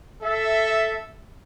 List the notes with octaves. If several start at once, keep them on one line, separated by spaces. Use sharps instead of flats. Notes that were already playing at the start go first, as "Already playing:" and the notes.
A4 E5